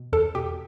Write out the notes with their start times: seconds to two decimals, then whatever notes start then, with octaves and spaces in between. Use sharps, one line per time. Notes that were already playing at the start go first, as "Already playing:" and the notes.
Already playing: B2
0.12 E2 A4
0.35 B2 G4